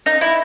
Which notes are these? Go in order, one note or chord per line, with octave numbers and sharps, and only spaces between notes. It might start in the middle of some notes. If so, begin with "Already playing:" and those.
D#4
E4